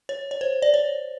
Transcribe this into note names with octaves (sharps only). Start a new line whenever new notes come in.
C#5
C#5
C5
D5
C#5